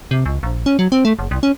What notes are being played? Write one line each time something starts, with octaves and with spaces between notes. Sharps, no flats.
C3
C#2
A#1
C#4
F#3
C4
A3
F#1
C2
C#4